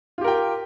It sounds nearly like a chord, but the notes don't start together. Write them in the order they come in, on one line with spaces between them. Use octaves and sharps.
F4 G4 A#4 G5